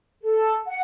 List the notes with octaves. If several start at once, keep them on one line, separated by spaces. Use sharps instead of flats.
A4
F#5